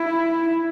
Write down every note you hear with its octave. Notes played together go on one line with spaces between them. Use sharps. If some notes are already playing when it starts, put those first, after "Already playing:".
Already playing: E4